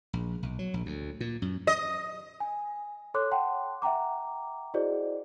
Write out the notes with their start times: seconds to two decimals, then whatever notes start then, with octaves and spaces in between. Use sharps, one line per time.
0.13 A#1
0.43 B1
0.59 F#3
0.74 A#1
0.86 D2
1.20 A#2
1.42 F#2
1.67 D#5
2.40 G#5
3.14 A4 C#5 C6 D6 F#6
3.32 F#5 G5 A5 C6
3.82 E5 F#5 G5 A#5 D6
4.74 E4 F#4 G#4 C5 D5 D#5